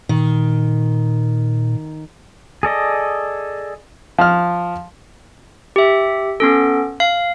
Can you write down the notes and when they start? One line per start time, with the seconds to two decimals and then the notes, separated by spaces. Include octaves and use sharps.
0.09 A#2 D#3
2.63 G#4 A4 D5 D#5
4.18 F3 F6
5.76 G4 E5
6.40 B3 C#4 A4
7.00 F5